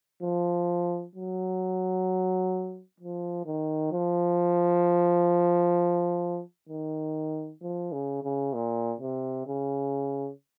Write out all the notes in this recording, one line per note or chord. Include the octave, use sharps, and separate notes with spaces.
F3
F#3
F3
D#3
F3
D#3
F3
C#3
C#3
A#2
C3
C#3